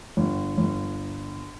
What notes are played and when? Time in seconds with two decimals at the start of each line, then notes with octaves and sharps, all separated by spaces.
0.17 G1
0.58 G1